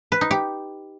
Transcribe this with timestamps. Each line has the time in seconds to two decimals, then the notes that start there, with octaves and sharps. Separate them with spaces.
0.12 B4
0.21 D#4
0.31 G4